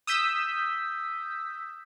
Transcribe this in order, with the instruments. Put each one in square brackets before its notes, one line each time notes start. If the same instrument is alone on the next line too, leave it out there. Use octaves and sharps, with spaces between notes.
[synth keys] D#6 E6 G6 B6